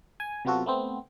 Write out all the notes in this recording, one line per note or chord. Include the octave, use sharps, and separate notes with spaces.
G#5
C3 F#3 B3 F4 F#4 A4
A3 B3 C4